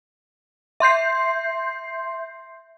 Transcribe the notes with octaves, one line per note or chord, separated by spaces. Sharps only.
E5 C6 G6 C7